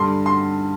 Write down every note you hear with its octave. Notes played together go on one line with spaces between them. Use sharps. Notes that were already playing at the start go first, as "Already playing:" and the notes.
Already playing: G2 D3 G3 C6
C6